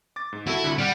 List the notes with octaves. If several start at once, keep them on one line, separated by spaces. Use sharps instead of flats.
D6 A6
G#2
E4 F#4 A4
C2 D3
G3 F#5 F6 D7